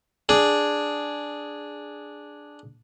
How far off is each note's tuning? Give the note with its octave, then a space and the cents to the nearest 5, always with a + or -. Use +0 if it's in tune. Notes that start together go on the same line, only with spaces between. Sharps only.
D4 +0 G#4 +0